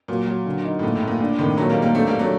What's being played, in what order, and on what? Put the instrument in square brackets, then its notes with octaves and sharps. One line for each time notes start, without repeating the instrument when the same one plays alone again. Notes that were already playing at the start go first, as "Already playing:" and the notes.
[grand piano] A#2 [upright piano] F#3
[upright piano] F#3
D3
D#4
[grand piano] A2
[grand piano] A#2 [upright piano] A3
[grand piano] A2
[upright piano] A3
[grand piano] A#2
[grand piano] A#2 [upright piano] D4
[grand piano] A2 C3 [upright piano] D#3
[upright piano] A#2 [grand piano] F#3 A3
[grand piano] G3 A#3
[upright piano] D#4
[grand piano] G3 A#3
[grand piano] A3 C4 [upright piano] D4
[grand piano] G3 A#3
[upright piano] D4
[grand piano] F#3 A3